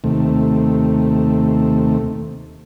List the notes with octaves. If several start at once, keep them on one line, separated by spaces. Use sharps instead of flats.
D#2 C3 A3